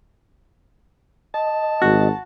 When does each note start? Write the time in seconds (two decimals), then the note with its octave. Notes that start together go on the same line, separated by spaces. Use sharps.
1.34 D#5 A5
1.82 G#1 F#4